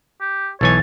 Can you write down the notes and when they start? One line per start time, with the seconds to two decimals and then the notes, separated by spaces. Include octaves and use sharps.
0.21 G4
0.61 B1 E3 C#5 G#5 A6